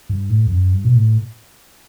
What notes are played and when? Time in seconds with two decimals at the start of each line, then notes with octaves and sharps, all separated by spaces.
0.09 G2
0.30 A2
0.47 E2
0.51 F#2
0.73 G2
0.85 B2
0.95 A2